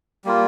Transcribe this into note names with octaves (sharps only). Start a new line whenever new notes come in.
G3 A#3 F4